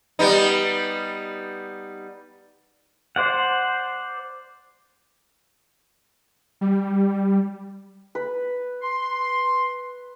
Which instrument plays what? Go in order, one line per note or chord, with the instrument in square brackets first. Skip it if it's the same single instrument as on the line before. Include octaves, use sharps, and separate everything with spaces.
[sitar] G3 B3 D#4
[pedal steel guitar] C5 D5 F#5
[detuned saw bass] G3
[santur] B4
[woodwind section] C6